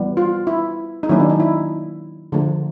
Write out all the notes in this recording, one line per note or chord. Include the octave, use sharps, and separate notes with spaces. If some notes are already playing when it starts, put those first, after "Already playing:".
Already playing: E3 G3 B3
F4
E4
D#4
D#3 F#3 A#3 C#4 E4
D4
D#4
E4
D3 F3 A3